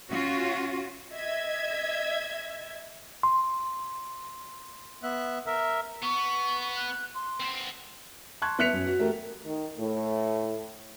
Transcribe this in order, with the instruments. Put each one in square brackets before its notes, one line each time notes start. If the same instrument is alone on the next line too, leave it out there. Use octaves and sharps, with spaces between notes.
[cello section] C#4 F4 F#4
[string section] D#5 E5 G#6
[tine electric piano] C6
[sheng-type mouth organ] B3 E5 F#6
A#4 E5
[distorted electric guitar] B3 [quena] C#6
[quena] F#6
C6
[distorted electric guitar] B3 C4
[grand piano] A5 C6 C#6 F#6 G#6
B3 E5 F#6 B6 C#7 F7
F#2
F#4
A3 G4 A#4
[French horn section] D#3
A2 A3